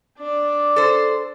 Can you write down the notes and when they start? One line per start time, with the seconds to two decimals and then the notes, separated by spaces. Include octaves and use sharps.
0.18 D4 D5
0.76 A4 C5